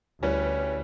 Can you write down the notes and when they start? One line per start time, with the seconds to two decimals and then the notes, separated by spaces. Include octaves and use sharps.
0.23 D2 G3 C#4 E4 B4